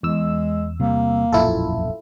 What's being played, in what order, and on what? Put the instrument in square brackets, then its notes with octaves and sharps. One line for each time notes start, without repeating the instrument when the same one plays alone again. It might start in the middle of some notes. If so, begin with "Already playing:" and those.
[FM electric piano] E2 E6 [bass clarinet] G#3
[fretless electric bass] C3 G3 [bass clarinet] A#3
[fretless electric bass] E1 A#1 F#2 [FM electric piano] E4 F4 A4